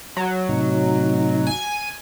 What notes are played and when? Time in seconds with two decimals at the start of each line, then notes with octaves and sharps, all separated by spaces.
0.17 F#3
0.49 A2 C3 D#4
1.47 G#5